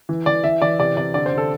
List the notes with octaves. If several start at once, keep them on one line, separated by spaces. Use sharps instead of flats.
E3
E3 D5
E3 E5
E3 D5
C3 D5
C3 D5
D3 D5
C5
D3
A4